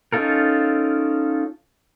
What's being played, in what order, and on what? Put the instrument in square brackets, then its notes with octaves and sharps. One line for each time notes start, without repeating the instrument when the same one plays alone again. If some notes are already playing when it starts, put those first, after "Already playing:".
[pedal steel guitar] C#4 D#4 F4 A4 A#4